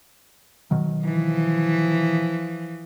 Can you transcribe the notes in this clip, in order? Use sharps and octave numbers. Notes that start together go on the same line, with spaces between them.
B2 D#3 F#3
E3 F3